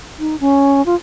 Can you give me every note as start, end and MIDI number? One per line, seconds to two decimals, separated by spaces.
0.20 0.36 63
0.40 0.84 61
0.86 0.95 65